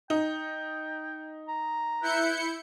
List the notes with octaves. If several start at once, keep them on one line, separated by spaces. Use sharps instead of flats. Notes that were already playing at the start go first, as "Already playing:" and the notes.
D#4 G5
A#5
E4 B4 G6 C#7